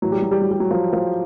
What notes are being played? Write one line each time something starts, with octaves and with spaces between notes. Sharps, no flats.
A2 E3 F#3
G3
F#3
G3
F#3
G3
F#3
F3
F3